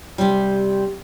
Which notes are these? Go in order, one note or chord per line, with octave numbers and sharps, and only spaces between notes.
C3 G3